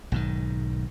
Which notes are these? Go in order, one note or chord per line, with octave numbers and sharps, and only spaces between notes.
B1 G#2 D#3